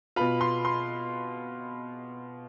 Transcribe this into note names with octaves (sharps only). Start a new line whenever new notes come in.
B2 B3 F4 B5
C6
C6